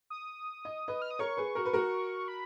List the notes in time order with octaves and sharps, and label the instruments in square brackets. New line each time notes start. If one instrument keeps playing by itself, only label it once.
[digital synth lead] D#6
[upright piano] D#5
B4 D#5
[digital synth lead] F6
D#6
[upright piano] A#4 C#5 [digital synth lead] C#6
[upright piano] G#4 B4
F#4 A#4
B4
F#4 A#4
[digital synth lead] B5